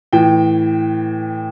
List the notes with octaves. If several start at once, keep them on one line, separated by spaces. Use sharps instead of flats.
A2 E3 G5